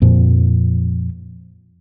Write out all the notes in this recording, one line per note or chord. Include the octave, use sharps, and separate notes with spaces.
F2 A#2 F3